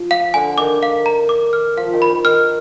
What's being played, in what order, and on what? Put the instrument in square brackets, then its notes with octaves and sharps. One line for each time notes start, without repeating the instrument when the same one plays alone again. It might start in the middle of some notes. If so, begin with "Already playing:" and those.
Already playing: [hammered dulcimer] F3
[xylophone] F5
[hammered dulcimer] D3 [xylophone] G#5
[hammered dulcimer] D#3 [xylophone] D6
[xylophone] F5
A#5
D6
F6
[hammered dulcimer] F3 [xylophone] F5
[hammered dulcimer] D#3
[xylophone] B5
[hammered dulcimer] D#3
[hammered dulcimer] D#3 [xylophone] F6